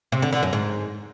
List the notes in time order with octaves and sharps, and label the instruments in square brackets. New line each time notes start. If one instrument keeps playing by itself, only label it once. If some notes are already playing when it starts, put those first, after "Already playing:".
[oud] C3
D3
D3
F#2
G#2